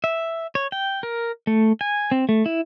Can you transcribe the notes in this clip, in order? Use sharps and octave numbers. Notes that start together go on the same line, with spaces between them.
E5
C#5
G5
A#4
A3
G#5
C4
A3
E4